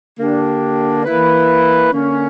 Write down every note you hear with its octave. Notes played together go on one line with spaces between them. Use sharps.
D3 A#3 D4 G4
E3 A#3 E4 B4
D3 A#3 C#4